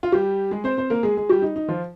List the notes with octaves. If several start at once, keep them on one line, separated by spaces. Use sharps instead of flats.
F4
G3 G4
G#3 G#4
C4 C5
C4 C5
A#3 A#4
G#3 G#4
G#3 G#4
G3 G4
D#4
D#4
F3 F4